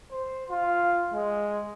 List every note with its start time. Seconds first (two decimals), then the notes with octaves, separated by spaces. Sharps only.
0.12 C5
0.50 F4
1.13 G#3